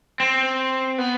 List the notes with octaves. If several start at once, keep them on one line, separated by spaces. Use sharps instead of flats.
C4
B3